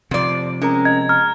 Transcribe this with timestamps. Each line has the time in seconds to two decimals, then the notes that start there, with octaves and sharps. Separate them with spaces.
0.11 F2 C3 F3 D5
0.62 G#3 C#4 A#4 A#5
0.85 D#5 G#6
1.09 A#5 F6